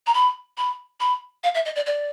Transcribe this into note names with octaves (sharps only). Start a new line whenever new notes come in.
A#5
B5
B5
B5
F5
E5
D#5
D5
D5